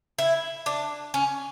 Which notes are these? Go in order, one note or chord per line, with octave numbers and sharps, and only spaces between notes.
E4
D4
C#4